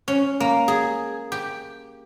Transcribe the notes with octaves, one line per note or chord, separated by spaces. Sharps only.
C#4
A#3
G#4
G4